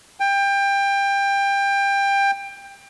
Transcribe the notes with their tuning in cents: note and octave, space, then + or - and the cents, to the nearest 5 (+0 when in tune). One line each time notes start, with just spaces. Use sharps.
G5 +25